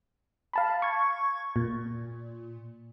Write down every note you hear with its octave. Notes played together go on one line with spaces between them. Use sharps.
F5 A5 B5
C#6 G#6
A#2